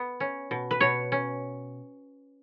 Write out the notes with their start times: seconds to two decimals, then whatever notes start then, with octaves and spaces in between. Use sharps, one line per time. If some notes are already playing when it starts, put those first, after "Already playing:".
Already playing: B3
0.20 C#4
0.51 B2
0.71 B4
0.81 B2 C#5
1.12 C#4